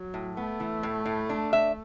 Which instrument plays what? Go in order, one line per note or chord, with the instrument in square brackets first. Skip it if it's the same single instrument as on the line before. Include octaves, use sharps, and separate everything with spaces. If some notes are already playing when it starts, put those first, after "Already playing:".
Already playing: [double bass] F#3
[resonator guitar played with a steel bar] A2
[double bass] A3 [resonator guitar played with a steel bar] B3
[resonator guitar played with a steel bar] E3
A2
A2
D4
E5